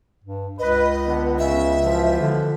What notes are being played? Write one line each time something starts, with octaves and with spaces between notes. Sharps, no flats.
G2
C#2 B4 D#5
D3 B3
C#3 E5
B2 E3 F3
D3